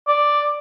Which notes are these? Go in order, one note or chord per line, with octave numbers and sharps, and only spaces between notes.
D5